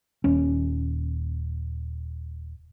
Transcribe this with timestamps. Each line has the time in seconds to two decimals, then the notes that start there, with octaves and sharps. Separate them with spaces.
0.24 D#1 C#4